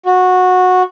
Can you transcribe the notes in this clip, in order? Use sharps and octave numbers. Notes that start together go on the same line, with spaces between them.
F#4